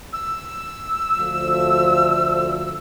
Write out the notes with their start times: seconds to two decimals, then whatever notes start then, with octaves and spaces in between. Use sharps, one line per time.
0.13 E6
1.18 D2 F3